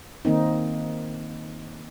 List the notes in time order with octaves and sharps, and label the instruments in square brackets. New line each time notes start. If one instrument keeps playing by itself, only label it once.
[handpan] D#3 A#3 C4 D#4